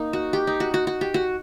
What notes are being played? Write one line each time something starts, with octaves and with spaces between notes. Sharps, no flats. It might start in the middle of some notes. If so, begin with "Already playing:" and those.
Already playing: A#3 D#4
F#4
G4
D#4
F#4
F#4
F#4
G4
F#4